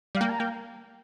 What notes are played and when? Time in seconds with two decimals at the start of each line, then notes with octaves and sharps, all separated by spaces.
0.15 G3 F5
0.21 A#3 G5
0.30 A#5
0.40 A#3 G5